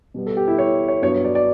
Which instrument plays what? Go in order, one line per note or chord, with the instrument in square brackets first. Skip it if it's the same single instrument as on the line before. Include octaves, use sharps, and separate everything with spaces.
[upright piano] B2 G3 B3
A4
G4
E4
C#5
C#5
G2 F#3 B3 C#5
D5
D5